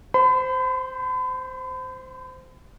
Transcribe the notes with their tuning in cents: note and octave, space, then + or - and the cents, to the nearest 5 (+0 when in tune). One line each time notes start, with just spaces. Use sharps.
C5 -10 B5 +40